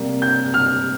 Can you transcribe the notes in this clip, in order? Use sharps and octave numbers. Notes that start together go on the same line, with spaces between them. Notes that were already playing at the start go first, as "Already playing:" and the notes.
Already playing: C3 G3 A#3
G6
F6